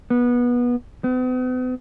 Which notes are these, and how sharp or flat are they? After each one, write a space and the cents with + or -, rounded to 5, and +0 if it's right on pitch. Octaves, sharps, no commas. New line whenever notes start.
B3 -20
B3 +45